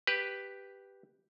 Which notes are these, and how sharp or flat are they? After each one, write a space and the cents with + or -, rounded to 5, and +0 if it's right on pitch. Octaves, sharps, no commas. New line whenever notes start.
G4 +0 B4 +0